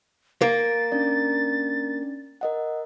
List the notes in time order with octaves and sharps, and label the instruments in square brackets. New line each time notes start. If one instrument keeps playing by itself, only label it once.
[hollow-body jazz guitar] A#3 [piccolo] A6 [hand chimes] C7 D7
[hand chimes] C#4 D4 D5
A#4 D#5 F#5